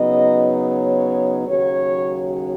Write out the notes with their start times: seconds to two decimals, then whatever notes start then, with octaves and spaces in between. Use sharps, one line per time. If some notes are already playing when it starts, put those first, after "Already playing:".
Already playing: C#3 F#3 B3 D#4 D#5
0.65 C#5
1.47 D#2 C#3 F#3 C#5